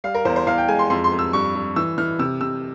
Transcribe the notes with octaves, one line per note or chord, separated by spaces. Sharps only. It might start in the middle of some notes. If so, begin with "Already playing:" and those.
G3 F5
A#4
E2 C5
C5
E2 F5
G5
G#3 G#5
C6
F2 C6
C6
F2
E6
G2 C#6
G2
E3 E6
E3 F6
C3 E6
C3 E6